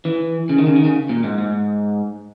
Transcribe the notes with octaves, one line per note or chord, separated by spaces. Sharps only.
E3
C#3
D#3
C#3
D#3
C#3
A#2
G#2
G#2